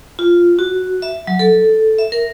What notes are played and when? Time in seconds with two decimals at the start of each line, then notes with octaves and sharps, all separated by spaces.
0.19 F4
0.59 F#4
1.02 E5
1.27 F#3
1.39 A4
1.98 E5
2.12 A#4